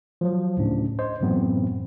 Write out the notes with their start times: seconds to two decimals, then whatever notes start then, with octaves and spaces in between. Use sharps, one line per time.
0.21 F3 F#3 C5
0.57 D2 A2 C#3 C#4 D4
0.99 C5 D#5
1.21 F#2 A2 E3 F#3 B3 C4